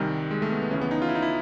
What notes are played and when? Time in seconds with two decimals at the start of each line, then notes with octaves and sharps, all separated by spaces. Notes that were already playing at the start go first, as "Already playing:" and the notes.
Already playing: C2 C3 D#3 G3
0.31 G#3
0.42 A3
0.51 B3
0.62 B3
0.71 C#2 C#3 E3 C#4
0.81 B3
0.91 D#4
1.02 F4
1.09 E4
1.15 D#4
1.22 E4